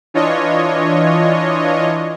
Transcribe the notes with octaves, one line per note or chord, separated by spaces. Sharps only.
E3 D4 F4 C#5 D#5